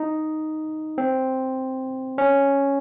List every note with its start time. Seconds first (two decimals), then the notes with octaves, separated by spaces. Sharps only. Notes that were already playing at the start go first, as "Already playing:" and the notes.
Already playing: D#4
0.98 C4
2.18 C#4